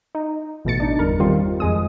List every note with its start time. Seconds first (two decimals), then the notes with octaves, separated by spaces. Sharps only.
0.15 D#4
0.65 A1 B2 A3 A6 C#7
0.80 D4 D#4
0.99 G1 E2 A#4
1.20 D#3 G3 C4 F4
1.60 F2 G#3 D#6